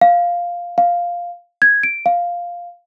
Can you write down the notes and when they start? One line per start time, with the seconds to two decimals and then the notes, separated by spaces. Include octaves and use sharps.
0.01 F5
0.78 F5
1.62 G#6
1.83 D7
2.06 F5